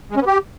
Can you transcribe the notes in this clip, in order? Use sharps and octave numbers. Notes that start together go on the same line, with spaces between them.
G#3
C#4
B3
G4